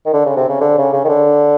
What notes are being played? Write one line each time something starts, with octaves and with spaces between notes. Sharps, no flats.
D#3
D3
C#3
C3
C#3
D3
C#3
C#3
D#3
D3